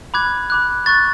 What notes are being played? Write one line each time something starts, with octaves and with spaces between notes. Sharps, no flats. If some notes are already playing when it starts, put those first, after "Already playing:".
B5 D6 F#6 G#6
B5 D6 F#6
C#6 F#6 A6